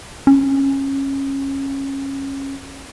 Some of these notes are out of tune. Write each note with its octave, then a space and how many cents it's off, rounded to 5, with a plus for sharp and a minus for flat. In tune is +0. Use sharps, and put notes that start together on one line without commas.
C#4 -20